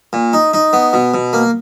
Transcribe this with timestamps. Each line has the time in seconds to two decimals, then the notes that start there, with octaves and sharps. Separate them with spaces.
0.13 A#2
0.33 D#4
0.53 D#4
0.73 B3
0.93 B2
1.14 B2
1.33 A#3